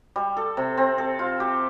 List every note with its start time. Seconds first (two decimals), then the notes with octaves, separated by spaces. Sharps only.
0.16 G3
0.37 A4
0.57 C3
0.77 C4
0.98 A4
1.19 F4
1.40 G4